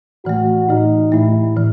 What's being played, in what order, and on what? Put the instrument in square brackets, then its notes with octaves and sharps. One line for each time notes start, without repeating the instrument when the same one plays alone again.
[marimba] A2 E3 A3 [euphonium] F#4
[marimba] A2 E3 A3 [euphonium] D#4
[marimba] A2 E3 A3 [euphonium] E4
[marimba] A2 E3